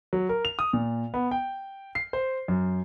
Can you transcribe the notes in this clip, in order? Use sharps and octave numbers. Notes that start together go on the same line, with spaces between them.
F#3
A#4
F7
D#6
A#2
B3
G5
C7
C5
F#2